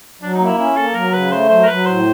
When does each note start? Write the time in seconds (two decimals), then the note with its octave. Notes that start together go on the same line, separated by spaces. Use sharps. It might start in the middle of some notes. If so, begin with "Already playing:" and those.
0.22 F#3 D4
0.34 D#4
0.39 A#3
0.46 E4
0.58 C#4 E4
0.76 A#3 A4
0.94 F#3 A#4
1.12 C#3 B4
1.31 A3 C5
1.49 F#3 C5
1.63 A#4
1.67 F#3 B4
1.86 A2 C5